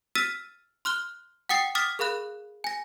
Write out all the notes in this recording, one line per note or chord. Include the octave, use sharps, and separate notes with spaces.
E6 F6 A6 B6 D#7 E7
C6 F6 F#6 G7
F#5 G5 D#6 A6 C7 C#7
D6 D#6 F6 A6 B6
G#4 A#4 F5 B5 F#6
G#5 A#6